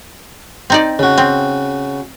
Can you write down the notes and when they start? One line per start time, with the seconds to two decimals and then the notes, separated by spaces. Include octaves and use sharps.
0.70 C4 D#4 D5
0.99 C#3 F#4
1.18 C4